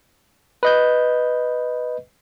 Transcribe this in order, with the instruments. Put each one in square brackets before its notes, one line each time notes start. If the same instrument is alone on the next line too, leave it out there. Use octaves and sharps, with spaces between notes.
[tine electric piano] B4 D#5 G6